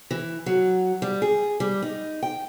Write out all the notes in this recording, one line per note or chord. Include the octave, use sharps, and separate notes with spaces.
E3
F#3
G3
G#4
G3
D#4
G5